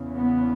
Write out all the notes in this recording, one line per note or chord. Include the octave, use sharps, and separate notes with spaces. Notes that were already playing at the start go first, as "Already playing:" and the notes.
Already playing: E2 C#3
B3